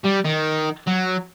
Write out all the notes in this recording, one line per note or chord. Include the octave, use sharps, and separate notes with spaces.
G3
D#3
F#3